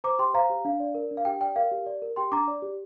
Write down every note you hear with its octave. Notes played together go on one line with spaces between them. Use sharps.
C5 A#5 D6
G4 G5 C6
C5 F5 A#5
G4
D4 F5
D5
A#4
D4
F5
G4 G5
D5 G5
A#4 F5
G4
D5
A#4
G4 G5 C6
D4 A#5 D6
D5
G4